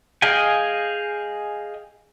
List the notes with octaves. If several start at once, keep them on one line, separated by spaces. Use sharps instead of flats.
G#4 D#5 F5 G5 G#5